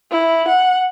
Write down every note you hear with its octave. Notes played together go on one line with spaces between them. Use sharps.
E4
F#5